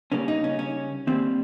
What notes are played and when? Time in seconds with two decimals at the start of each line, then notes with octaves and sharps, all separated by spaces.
0.12 C#3 G3 A#3 C#4
0.28 D#4
0.44 C#4
0.59 C#4
1.07 D#3 G3 A#3 C4